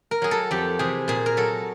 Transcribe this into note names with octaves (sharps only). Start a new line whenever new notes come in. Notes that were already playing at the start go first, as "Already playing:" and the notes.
A#4
F#3 G#4
A4
F2 G4
C3 E3 G#4
A#2 G#4
A#4
F#3 A4